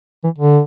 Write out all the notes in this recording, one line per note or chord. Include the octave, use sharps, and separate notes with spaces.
E3
D3